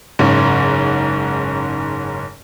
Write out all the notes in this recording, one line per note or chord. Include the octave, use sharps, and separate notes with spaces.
F#1 G#2 C#4